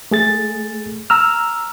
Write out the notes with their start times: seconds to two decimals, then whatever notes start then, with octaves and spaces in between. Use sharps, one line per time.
0.11 A3 G#4 A6
1.10 A#5 E6 F6